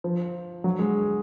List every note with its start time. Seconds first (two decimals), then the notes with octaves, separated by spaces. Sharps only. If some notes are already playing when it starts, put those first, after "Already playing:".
0.04 F3
0.64 F#3
0.79 G#3